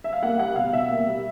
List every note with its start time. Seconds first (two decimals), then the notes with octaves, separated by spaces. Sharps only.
0.04 E5
0.13 F5
0.23 A#3 F#5
0.39 G3 F#5
0.56 B2 F5
0.73 B2 E5
0.90 A#3
1.07 G3